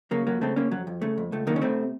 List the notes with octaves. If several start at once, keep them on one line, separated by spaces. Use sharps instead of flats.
C#3 F#3 A#3
F2 F#3 A#3
C#3 A3 C4
C#3 A#3 C#4
F2 F#3
F2
C#3 A3
F2
C#2 A3
D#3 F#3 A#3
C#4
C3 A3 C4